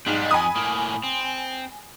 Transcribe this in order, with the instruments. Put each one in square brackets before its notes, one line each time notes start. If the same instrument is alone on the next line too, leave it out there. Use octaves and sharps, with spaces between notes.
[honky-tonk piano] B1 G#2 [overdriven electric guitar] G3
[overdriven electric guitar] F2 [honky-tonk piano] G#5 B5 D#6
[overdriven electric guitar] A2 A#3
C4